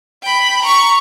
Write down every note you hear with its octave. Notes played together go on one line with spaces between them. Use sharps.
G5 B5
A#5 C#6